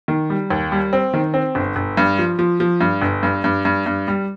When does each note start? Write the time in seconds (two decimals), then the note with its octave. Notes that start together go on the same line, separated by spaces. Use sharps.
0.08 D#3
0.30 G3
0.50 D#2
0.72 G3
0.93 C4
1.14 D#3
1.34 C4
1.55 G1
1.76 G1
1.97 G2
2.19 F3
2.39 F3
2.60 F3
2.81 G2
3.02 G1
3.23 G2
3.44 G2
3.65 G2
3.86 G2
4.08 G3